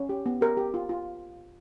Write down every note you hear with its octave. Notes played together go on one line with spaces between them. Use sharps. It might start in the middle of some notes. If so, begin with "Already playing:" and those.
Already playing: C#4
G4
B3
G4 A#4
G4
F4
F4